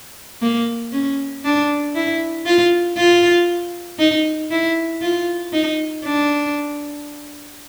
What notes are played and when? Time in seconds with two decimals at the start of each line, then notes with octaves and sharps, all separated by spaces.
0.42 A#3
0.92 C#4
1.44 D4
1.95 E4
2.46 F4
2.97 F4
3.99 D#4
4.51 E4
5.01 F4
5.53 D#4
6.04 D4